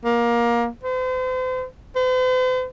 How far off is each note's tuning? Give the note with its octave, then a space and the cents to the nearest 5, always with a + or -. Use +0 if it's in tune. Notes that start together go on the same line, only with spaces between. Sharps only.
A#3 +20
C5 -40
C5 -45